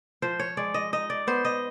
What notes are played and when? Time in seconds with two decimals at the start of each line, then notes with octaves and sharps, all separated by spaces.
0.22 F3 C5
0.39 C#5
0.57 G#3 D5
0.74 D#5
0.93 D#4 D#5
1.10 D5
1.27 B3 C5
1.45 D#5